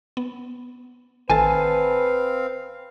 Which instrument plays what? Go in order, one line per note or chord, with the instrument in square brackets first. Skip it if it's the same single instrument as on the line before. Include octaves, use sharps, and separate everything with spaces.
[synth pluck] B3
[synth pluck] A1 D#3 A4 [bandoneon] C4 F5 [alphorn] B4 [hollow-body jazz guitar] G#5 A5